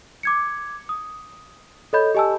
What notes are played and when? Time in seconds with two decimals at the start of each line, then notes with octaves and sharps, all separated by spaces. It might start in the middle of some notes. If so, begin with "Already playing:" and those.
0.23 D6 G#6 C#7
0.89 D#6
1.93 A4 C#5 D#5 B5 G6
2.15 G4 D#5 G#5 A5 E6